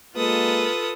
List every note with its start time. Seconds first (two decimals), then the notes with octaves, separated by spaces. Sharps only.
0.16 G#3 A#3 F4 A4 B4 D#6